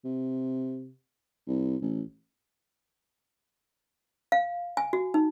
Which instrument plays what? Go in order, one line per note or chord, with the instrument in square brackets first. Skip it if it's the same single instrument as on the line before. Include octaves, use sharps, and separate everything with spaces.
[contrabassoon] C3
C2
A1
[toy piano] F5
G#5
F#4
D#4